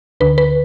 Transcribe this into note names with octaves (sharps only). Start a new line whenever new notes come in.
D2 D3 B4
B4